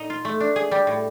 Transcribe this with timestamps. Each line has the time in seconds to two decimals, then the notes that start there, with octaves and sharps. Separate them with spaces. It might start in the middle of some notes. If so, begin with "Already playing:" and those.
Already playing: A#2 D#4
0.10 F4
0.25 A3
0.40 D4
0.56 G#4
0.71 G3
0.87 A2